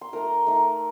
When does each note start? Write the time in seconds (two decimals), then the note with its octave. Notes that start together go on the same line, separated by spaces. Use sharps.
0.01 C6
0.13 A3 D#4 A#4 A#5
0.47 A3 D#4